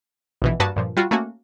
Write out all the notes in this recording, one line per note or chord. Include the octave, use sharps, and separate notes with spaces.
A#1 B2 E3
G2 A#3 F#4 B4 A5 D#6
G2 A#2 F3
G3 F4 F#4
A3 A#3 C#4 F#4